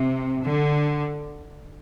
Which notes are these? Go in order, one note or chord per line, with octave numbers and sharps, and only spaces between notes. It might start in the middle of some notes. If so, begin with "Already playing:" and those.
Already playing: C3
D3